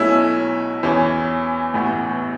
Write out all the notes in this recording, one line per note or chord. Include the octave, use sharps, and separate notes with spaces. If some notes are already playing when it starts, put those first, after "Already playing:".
Already playing: B1 B2 A3 C#4 E4
E2 E3 C#4
A1 A2 E3 B3